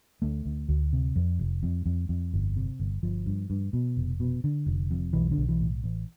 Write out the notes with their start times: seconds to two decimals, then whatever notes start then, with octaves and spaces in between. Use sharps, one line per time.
0.22 D2 A3
0.45 D2
0.69 D2
0.93 C3
1.16 F2
1.39 F1
1.63 F2
1.86 F2
2.09 F2
2.34 G1
2.56 C3
2.80 G1
3.03 G1 F3
3.26 G2
3.50 G2
3.73 B2
3.97 F1
4.20 B2
4.44 D3
4.66 F1
4.91 F2
5.13 B1 E3
5.31 D3
5.38 B1
5.49 E3
5.61 A2
5.84 A1